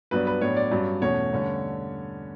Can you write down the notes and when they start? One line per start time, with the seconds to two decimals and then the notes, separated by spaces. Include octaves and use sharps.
0.11 G2 F#3 B3 D4 B4
0.27 B4
0.41 A2 F#3 B3 D4 C#5
0.56 D5
0.71 G2 F#3 C#4
1.02 E2 B2 A3 C#4 C#5
1.32 G2 D3 A3 C#4